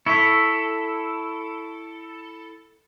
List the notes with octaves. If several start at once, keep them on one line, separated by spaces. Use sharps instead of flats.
E4 A4 C#5 E5